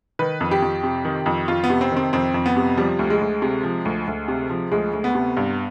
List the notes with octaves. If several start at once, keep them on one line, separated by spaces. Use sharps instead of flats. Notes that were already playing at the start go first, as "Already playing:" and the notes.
D#3 B4
F2
G4
F2
C3
D#3
F2
F2 F4
B3
C3
C4
D#3
C4
F2 C4
F2
B3
C3
F3 G3
D2
G#3
D2
C3
F3
D2
D2
C3
F3
D2 G#3
D2
B3
C3
G2